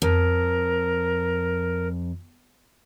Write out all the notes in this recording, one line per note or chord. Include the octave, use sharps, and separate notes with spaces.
F2 A#4